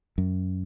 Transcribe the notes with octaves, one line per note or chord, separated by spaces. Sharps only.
F#2